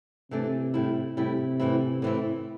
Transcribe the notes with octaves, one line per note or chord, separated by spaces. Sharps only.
C3 E3 A3 D4
A2 G3 E4
A2 C3 G3 E4
A2 E3 C4 E4
A2 E3 C4 E4